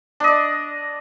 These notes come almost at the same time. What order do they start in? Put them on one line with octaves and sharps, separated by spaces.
D4 D#5 D5